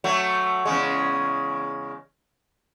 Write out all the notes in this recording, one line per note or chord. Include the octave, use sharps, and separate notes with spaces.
F#3 A3
E2 C#3 G#3